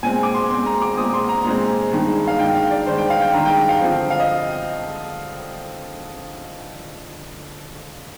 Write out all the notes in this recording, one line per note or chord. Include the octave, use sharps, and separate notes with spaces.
A#2 G#3 C4 G#5
D6
C6
A#2 G#3 C4 C6
A#5
D6
A#2 G#3 C4 D#6
C6
A#5
A#2 G#3 C4
G2 D#3 G#3
F5
G2 D#3 G#3 G5
F5
D5
G2 D#3 G#3 C5
G5
F5
G5
G2 D#3 G#3 A#5
G5
F5
D3 F3 C4
F5
D#5